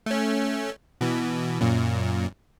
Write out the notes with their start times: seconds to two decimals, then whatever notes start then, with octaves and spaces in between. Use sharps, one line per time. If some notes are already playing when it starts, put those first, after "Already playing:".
0.06 A3 C#4
1.01 B2 E3
1.61 F#2 A#2